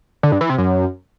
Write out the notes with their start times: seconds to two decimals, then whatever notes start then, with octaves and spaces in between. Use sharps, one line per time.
0.23 D3
0.32 G2
0.41 E3
0.50 C3
0.58 F#2